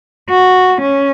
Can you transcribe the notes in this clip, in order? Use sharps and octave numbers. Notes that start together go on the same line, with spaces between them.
F#4
C#4